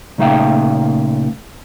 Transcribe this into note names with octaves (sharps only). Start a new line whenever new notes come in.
A#2 C#3 A3 D#4 F5 G5